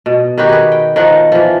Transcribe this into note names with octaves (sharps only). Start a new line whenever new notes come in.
B2
D#3 B3 F#4 G4
G#4 B4
G5
D#3 F3 F#5
E3 F3